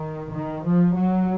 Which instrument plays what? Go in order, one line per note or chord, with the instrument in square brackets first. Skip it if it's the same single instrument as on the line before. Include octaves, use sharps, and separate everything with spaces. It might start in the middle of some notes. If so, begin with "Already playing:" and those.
Already playing: [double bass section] D#3
D#3
F3
F#3